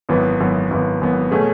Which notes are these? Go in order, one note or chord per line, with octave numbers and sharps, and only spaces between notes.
G#1 F#2 E3 B3
G#1 F#2 E3 B3
G#1 F#2 E3 B3
G#1 F#2 E3 B3
B2 A3 C#4 G#4